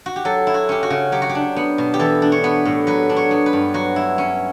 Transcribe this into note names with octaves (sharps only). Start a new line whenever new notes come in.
F#4
G4
F#3 A4
E4
F#4
C#4 G4
F#4
C#3
F#3 G4
F#4
G4
D4
B3
B2
G4
E3 A4
D4
C#5
B3 B4
A2
F#3 B4
D4
C#5
B3
B4
G2
F#3 F#4
E4
C#4